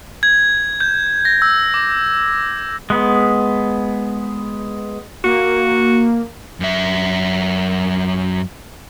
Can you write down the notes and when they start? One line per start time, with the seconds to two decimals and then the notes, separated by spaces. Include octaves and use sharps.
0.23 G#6
0.80 G6
1.25 A#6
1.42 E6
1.74 D6
2.90 G#3 B3
5.24 A#3 F#4
6.60 F#2 E5